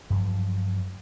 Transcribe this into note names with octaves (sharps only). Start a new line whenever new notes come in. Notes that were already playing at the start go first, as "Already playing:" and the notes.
G2 F3 F#3